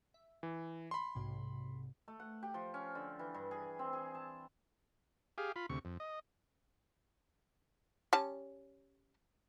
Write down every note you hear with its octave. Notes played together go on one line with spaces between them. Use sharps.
E5
E3
B5 C6
B1 G#2 C3
A3
F#5
G4
F3
C#4
D3
E3
G2
G#4
C4
G#4
A5
G4 G#4 F5
F4 B5
D2 C3 C#6
F2
D#5
G3 C#4 A5